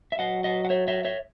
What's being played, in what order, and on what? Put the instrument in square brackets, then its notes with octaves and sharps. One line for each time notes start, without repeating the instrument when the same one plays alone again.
[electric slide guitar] E5
[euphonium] F#3 [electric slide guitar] D#5 F#5
[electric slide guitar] D#5 F#5
F#5
C#5 E5
C#5 E5
C#5 E5